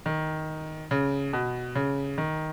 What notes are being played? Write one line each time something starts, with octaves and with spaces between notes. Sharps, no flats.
D#3
C#3
B2
C#3
D#3